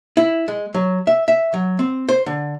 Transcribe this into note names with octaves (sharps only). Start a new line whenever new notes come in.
E4
G#3
F#3
E5
E5
F#3
C4
C5
D3